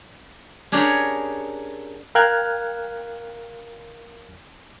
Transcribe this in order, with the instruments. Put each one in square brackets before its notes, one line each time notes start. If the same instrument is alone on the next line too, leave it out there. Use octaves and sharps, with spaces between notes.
[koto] C#4 D4 G4 G#4 A#4 C#5
[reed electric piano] A#4 F5 G5 F6 F#6 G#6